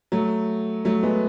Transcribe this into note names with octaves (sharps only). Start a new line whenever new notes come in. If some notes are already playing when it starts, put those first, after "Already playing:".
F#3 A3
F#3 A3
G#3 B3